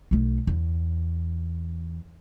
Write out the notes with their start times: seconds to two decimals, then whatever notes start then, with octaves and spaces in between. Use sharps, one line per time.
0.11 B1 A3
0.47 E2